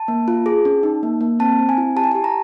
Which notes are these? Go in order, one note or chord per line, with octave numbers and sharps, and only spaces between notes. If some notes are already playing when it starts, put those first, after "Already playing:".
Already playing: A5
A#3
F4
G#4
C#4
D#4
A#3
A#3
C4 A5
C4
G#5
E4
G4 A5
G#5
G4 A5
A#5